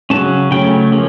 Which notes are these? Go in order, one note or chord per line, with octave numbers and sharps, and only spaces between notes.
C#3 F#3 A3 C#4 A5
C#3 F#3 A3 C#4 G5
F3 A#3 C#4